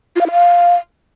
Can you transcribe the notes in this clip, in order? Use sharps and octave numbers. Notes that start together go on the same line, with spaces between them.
F4
F5
E4
F5